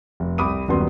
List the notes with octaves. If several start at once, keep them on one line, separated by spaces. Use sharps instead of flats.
F1
C2 B5 D6 D#6 D#7
D#1 F#2 F#3 B3 C6